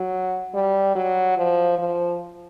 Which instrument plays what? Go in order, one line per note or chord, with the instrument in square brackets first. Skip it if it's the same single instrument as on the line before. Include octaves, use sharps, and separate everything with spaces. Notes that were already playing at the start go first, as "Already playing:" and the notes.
Already playing: [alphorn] F#3
G3
F#3
F3
F3